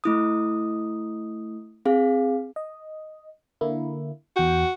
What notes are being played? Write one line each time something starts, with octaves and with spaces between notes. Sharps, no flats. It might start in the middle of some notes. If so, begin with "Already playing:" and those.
A3 E4 D#6
C4 G#4 F5
D#5
D3 A#3 E4
E2 F#4 G5